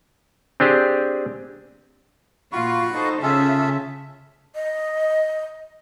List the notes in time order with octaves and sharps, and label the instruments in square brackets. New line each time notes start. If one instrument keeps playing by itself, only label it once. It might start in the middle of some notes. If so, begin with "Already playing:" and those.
[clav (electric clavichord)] C4 D4 G4 G#4
[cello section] A#2 F4 [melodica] F#4 B5 C#6
[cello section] D#4 A4 C5
[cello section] C#3 E5 [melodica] F4 G#4 A4
[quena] D#5